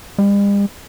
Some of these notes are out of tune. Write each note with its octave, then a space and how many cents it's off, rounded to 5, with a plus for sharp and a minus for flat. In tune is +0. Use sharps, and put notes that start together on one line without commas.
G3 +45